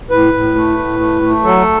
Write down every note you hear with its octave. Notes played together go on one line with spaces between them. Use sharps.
A2 B4
A2
A3
A2
A3
A3
F#3 A4